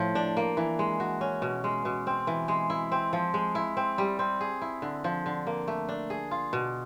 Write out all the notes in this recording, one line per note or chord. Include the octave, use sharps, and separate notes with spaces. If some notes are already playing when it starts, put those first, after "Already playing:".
Already playing: A2 F3
D4
A#3
E3
G#3
F#4
C#4
B2
G#3
B2
C4
E3
G#3
E4
C4
F3
G#3
E4
C4
G3
C4
G#4
E4
D3
F3
D3
A#3
A3
D4
G#4
F4
B2